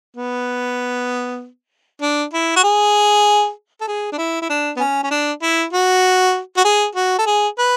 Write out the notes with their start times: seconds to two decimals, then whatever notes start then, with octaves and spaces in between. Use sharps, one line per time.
0.17 B3
2.02 D4
2.33 E4
2.56 F#4
2.64 G#4
3.81 A4
3.88 G#4
4.12 D4
4.18 E4
4.42 E4
4.50 D4
4.76 B3
4.80 C#4
5.03 C#4
5.11 D4
5.42 E4
5.73 F#4
6.57 F#4
6.65 G#4
6.95 F#4
7.19 A4
7.26 G#4
7.58 B4